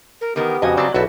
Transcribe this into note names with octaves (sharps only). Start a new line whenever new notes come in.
A#4
E2 D#3 B3 G4 A#4
F2 C#3 F#4 D#5 G#5
C#3 F#3 C4 D5 A5
B1 C#3 E4 F#4 A4 E5